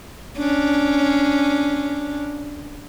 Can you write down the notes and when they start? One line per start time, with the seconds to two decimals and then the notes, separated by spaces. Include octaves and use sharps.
0.38 C#4 D4